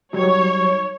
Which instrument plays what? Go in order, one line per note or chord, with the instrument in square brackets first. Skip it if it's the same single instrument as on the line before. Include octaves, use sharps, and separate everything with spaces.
[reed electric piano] F#3 G3 D#4 [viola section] C#5